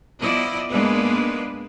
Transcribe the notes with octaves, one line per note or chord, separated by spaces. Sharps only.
F3 B3 E4 D5 D#5
G#2 G#3 A#3 B3 D4 B4